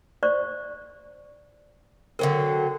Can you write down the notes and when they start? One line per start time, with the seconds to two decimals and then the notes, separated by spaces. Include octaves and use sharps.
0.23 C5 D5 C#6
2.19 D3 F#3 C4 A#4